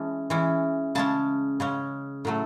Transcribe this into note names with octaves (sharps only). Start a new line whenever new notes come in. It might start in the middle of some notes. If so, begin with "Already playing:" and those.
Already playing: E3 G#3 C#4 A5
E3 G#3 C#4
C#3 G#3 C#4 A5
C#3 G#3 C#4
A2 F#3 A3